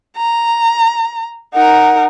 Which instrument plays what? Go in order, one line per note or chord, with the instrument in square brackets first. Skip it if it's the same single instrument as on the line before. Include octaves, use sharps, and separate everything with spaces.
[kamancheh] A#5
[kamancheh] D#4 A#4 [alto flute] F#5